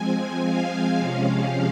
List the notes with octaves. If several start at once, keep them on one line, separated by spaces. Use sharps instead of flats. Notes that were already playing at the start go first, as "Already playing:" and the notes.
Already playing: F3 G#3 C4 G#5
F5
C3 F3 G#3 C#4